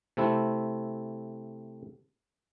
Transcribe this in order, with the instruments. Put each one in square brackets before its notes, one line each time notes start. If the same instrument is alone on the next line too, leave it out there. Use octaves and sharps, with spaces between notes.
[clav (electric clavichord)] C3 A3 C4 E4